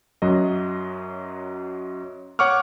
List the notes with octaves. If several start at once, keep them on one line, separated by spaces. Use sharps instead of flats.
F#2 F#3 D#5
C#5 F#5 C#6 D6 F6